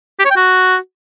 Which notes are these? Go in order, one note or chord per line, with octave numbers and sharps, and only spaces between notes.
G4
C#5
G5
F#4